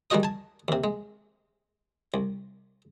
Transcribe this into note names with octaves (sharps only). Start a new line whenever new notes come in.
D#3 G3 G#3 F#4 D#5 D#6
G#5 A5
D#2 C3
G#3
C2